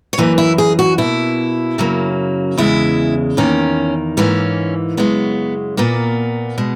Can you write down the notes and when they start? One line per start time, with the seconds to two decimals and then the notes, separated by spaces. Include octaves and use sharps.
0.13 C#5
0.18 F#2 E3 A#3 B4
0.38 E4
0.58 G#4
0.79 F#4
0.98 B2 A#3 E4
1.78 F#2 C#3 F#3 A#3
2.58 E2 C#3 G#3 E4
3.37 E2 D#3 A#3 C#4
4.17 G#2 E3 A#3 C#4
4.97 F#2 C#3 G#3 B3
5.77 A#2 A#3 B3
6.58 B2 G#3